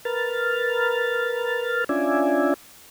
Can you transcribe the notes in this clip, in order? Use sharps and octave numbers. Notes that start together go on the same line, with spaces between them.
A#4 B4 F6 A6
C#4 D4 F4 D5 E5 G#5